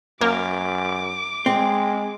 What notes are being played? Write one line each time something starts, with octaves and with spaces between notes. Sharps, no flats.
F#2 A#3 D6
G#3 C4